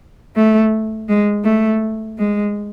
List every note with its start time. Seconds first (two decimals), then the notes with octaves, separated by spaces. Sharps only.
0.36 A3
1.09 G#3
1.45 A3
2.18 G#3